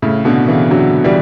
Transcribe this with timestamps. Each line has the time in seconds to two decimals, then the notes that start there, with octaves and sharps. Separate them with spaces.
0.02 A2 C#3
0.25 B2 D3
0.48 C#3 E3
0.71 D3 F#3
1.04 E3 G3